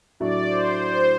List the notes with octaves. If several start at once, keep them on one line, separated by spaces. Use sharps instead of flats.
A2 F#3 A3 D4 F#4 D5
C5
C5